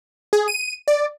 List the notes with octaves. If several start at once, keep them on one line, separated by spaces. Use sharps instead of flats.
G#4
D#7
D5